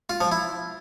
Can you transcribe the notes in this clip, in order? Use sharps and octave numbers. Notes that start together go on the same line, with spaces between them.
F4
F3
E4